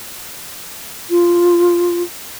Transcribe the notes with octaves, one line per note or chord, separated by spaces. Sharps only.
F4